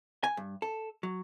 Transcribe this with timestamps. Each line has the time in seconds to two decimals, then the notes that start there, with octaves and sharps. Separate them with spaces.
0.24 G#5
0.37 G2
0.62 A4
1.03 F#3